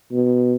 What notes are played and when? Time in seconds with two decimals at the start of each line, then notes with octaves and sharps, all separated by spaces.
0.12 B2